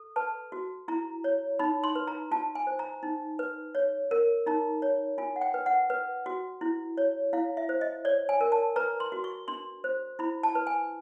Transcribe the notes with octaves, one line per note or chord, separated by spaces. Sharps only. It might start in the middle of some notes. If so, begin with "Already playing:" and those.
Already playing: A4
B4 A5
F#4
E4 A#5
C#5
D#4 B5
C6
B4
A#5
F4 A5
G#5
C5
A#5
D#4
B4
C#5
A#4
D#4 A#5
C#5
F4 G#5
F#5
G5
B4
F#5
B4
F#4
E4
C#5
E4 F5
E5
C5
D#5
C#5 D5
G#5
A#4
A5
B4 A#5
C6
F#4
C#6
D4 C6
C5
E4 B5
A5
B4
G#5